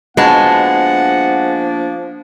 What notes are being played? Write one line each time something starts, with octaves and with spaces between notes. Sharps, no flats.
F3 G#3 A#3 B3 D4 F#4 F#5 A5